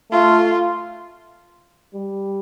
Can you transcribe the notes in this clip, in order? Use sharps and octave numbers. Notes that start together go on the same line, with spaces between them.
A3 F4
G3